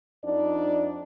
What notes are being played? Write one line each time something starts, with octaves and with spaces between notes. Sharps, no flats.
F2 D4 D#4 D5